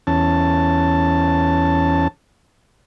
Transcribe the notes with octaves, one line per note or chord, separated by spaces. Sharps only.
E2 C#4 A5